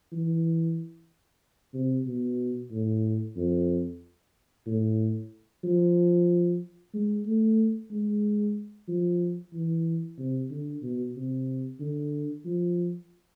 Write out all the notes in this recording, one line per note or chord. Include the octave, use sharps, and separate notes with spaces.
E3
C3
B2
A2
F2
A2
F3
G#3
A3
G#3
F3
E3
C3
D3
B2
C3
D3
F3